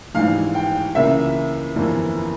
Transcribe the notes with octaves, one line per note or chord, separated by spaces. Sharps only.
A#1 G#2 E3 G3 F5
G5
C#2 C#3 E3 A#3 E5
G1 F2 E3 A#3